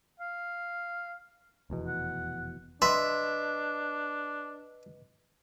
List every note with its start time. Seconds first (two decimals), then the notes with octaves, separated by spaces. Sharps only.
0.20 F5
1.70 F1 E2 B2
1.88 F#5
2.82 D4 B4 D#5 E5 C6